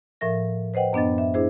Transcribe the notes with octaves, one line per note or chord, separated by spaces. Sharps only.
A2 F3 A#4 E5 A#6
B4 C5 D#5 F#5 G5
F#2 B3 D4 D#5 A6
E5
D4 E4 G#4 C5